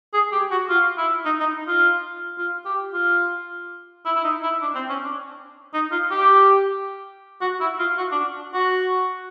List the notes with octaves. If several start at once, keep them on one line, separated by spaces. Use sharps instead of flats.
G#4
G4
F#4
F4
E4
D#4
D#4
F4
F4
G4
F4
E4
E4
D#4
E4
D4
C4
C#4
D4
D#4
F4
G4
F#4
E4
F4
F#4
D4
F#4